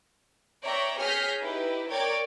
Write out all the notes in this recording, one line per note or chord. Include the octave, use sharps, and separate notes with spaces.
C#5 D5 E5 G5 A#5
G#4 C#5 F6 G6 A#6 B6
D#4 E4 G4 B4
A#4 C#5 D5 G5 D6 G#6